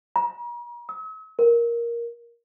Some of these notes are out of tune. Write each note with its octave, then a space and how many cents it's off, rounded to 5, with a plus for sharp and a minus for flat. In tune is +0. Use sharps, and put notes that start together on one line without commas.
A#5 +40
E6 -45
A#4 +10